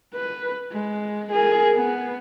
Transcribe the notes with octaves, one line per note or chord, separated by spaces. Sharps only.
B4
G#3
G#4 A#4
B3